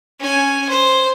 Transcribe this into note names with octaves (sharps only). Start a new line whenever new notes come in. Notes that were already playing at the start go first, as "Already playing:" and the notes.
C#4 G#5
C5